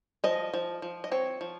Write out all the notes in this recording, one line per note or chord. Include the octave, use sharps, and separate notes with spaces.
F3 D#5
F3
F3
D#5
C4 C#5
F3